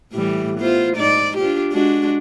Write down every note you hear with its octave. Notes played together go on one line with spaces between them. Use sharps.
A2 E3 G3
B3 F4 C5
G#2 D#4 D5
D4 F4 G4
G#3 D4 F#4